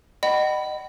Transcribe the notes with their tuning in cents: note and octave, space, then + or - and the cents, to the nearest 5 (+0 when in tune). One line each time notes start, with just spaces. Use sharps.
D#5 -25 F#5 +40 B5 +0